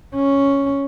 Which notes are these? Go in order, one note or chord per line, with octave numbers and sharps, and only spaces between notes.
C#4